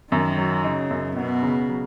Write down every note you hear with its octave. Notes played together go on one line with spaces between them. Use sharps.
F#2 D#3
F#3
C#3 D#4
F#2
B2 B3
C#3
F#3